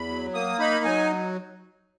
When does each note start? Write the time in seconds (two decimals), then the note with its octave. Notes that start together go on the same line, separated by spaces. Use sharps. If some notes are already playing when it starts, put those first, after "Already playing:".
Already playing: E2 B5
0.08 F#3
0.34 A#3 D#6
0.59 D#4 B5
0.85 F#3 G#5